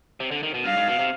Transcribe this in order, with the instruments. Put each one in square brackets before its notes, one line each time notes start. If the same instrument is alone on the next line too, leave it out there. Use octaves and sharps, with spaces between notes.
[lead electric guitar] C3
D3
D#3
B2
[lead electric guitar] G2 [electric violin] F5
[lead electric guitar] G#2
B2
C3